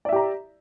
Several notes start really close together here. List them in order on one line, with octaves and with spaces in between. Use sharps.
D5 E5 G4 A#5